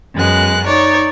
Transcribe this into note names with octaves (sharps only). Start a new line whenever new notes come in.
F#2 G#3 B3 F#6
D#4 C#5 D5